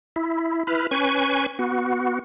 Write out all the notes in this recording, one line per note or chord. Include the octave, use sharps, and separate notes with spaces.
E4
E4 B4 F6
C#4 B4 G#5 C#6
B3 F#4